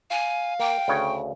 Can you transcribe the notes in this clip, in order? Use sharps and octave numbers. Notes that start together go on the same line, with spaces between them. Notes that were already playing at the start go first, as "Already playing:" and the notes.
F5 G#5
A#3 G5
D2 C#3 C#5